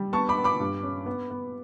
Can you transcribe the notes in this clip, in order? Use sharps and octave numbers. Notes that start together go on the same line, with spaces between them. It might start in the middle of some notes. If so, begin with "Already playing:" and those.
Already playing: G3
B3 A5 C#6
B5 D6
B3
B5 D6
G2
C#4
B3
B3